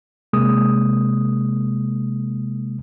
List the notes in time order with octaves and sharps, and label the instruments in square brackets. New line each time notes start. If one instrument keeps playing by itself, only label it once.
[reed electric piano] C3 G#3 A#3 D#6